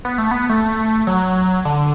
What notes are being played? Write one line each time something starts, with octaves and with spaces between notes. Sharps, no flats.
B3
A3
B3
A3
F#3
D3